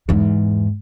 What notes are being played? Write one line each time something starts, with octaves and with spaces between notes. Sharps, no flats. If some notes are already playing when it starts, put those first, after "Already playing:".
E2 G#2